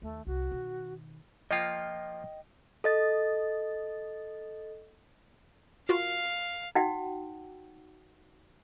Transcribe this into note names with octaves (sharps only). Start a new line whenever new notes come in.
D#2 A3
C2 F#4
B2 D#3
F3 A#3 F4 D#5 G5
A4 D#5 A6
F4 F#4 A#4 F5
D#4 F#4 F#5 G5